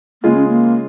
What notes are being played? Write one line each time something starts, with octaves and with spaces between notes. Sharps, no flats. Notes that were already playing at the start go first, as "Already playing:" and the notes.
C#3 G#3 A#3 F4 G#4
C#4
A#3